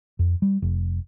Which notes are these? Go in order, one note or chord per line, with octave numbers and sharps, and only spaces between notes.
F2
G3
F1